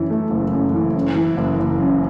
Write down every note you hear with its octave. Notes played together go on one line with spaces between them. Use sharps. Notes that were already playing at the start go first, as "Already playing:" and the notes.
Already playing: F#2 E3
A3
F#1
F#2
E3
F#2
E3
F#1
F#1
F#2